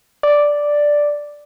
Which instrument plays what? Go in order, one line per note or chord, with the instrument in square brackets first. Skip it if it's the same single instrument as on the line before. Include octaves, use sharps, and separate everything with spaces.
[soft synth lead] D5